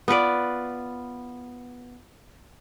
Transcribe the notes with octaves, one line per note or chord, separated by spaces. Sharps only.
B3 F4 B4 D5